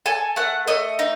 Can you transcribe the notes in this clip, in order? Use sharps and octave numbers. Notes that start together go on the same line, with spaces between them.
A4 G#5
A3 F#5
A3 D#5
D#4